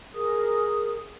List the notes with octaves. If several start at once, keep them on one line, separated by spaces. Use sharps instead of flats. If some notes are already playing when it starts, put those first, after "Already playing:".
G#4 A#4 D#6